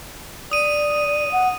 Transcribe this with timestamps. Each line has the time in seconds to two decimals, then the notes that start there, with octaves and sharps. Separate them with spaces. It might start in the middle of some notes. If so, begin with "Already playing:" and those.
0.51 D5 D#6 D#7
1.32 F#5